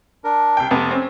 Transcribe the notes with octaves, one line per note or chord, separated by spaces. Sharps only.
D4 A#4
C2 G5
F1 B3 A5 D6
C4 C#4